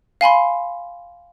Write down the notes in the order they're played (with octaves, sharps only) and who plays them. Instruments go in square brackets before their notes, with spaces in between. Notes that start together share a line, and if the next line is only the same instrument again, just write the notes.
[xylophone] F5 G#5 B5 C6